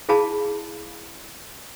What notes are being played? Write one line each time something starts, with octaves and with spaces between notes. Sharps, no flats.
E4 G#4 F5 A5 B5